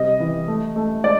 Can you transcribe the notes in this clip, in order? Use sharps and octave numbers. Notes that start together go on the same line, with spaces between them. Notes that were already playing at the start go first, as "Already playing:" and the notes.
Already playing: C3 G3 D#5
E3
A3
A3
G#3 D5